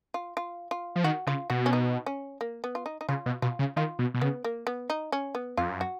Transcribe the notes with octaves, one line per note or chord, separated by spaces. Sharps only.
F4
F4
F4
F3
D#3 F#4
C#3 F4
B2 F#4
C#4
D#4
C#4
A#3
B3
F4
D#4
D#4
C#3 F4
B2
B2 F4
C#3
D#3 F4
B2
B2
C#3 B3
A#3
B3
D#4
C#4
B3
F2 F4
F#2
F#4